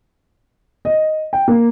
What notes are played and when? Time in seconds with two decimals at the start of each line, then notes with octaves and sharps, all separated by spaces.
0.85 D#5
1.33 G5
1.48 A#3